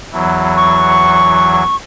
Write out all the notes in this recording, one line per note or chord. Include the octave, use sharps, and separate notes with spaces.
E2 E3 F#3
C#6